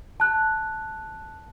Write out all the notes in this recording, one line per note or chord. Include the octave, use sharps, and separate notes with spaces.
A5 F#6